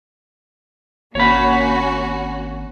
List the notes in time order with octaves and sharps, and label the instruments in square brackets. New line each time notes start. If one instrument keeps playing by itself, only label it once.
[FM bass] G#1 [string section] A#3 C#4 F#4 [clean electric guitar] C#5 B5